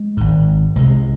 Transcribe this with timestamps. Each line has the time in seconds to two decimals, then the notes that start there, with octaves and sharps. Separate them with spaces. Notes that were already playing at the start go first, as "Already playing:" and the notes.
Already playing: G#3
0.17 G#1 G#2
0.76 C2 C3 G#3